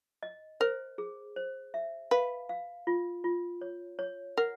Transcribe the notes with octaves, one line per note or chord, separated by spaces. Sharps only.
D#5
A#4 C5
G#4
C5
E5
B4 F5
F5
F4
F4
C#5
C#5
A#4 F#5